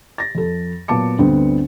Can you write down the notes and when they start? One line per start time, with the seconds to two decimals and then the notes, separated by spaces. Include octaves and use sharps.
0.18 A6 A#6
0.35 F2 A4
0.88 A#2 F#3 B3 A5 D6 C#7
1.19 D2 G2 D3 B3 C4